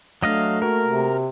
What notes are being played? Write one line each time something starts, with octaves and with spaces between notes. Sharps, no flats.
F#3 A3 D4 D#5 F5 A#6
A#3 F#4 A#4
C3